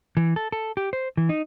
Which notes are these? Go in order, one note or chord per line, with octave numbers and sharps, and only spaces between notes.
E3
A4
A4
G4
C5
E3
D#4